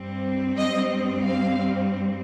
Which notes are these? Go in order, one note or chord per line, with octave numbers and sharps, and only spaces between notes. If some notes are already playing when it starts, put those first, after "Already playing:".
Already playing: G2 G3 C4
D#5
F5